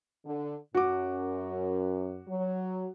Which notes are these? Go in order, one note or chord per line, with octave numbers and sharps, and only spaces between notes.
D3
F#2 F#4 D6
F#3